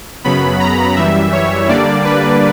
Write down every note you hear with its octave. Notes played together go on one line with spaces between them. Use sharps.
F#2 C#3 F#3 B3 B5
A#5
F#2 E3 G3 E5
C#5
D3 G3 A#3 D4 D5
B4